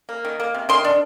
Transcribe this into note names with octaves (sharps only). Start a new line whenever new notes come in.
A#3
D#3
A#3
C3
D#3 C6
D4